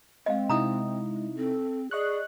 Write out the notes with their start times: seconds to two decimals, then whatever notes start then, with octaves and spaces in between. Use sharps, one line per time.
0.26 G#3 C4 D#5 F5
0.49 C3 D#4 E4 A#5 D#6
1.37 C4 A4
1.91 G#4 D5 D#5 C#6 F#6